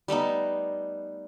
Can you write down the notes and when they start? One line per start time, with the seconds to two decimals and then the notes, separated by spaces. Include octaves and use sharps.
0.08 G3 A3 B3 D#4